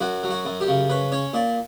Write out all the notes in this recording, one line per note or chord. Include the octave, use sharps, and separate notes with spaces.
F#2 F#4
F#3
F#4
F#2
G4
C#3
C#4 B4
C#4 C#5
A#2 D5